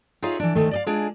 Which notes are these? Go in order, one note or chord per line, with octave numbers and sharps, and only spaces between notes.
D#4 F4 G#4 C#5 E5 F5
E3 D4
D2 D#3 A3
D5 D#5 F5
G#3 D4 F4 G#4